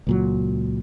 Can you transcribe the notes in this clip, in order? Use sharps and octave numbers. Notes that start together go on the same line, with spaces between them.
C#2 A#2 F#3